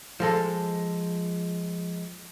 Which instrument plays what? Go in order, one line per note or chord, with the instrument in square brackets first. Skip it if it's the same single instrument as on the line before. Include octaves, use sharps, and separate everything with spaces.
[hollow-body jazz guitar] F3 G#3 A4